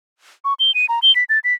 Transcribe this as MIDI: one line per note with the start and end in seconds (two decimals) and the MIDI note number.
0.45 0.54 85
0.60 0.74 103
0.75 0.86 99
0.89 1.00 82
1.02 1.14 103
1.16 1.24 95
1.29 1.39 93
1.44 1.54 95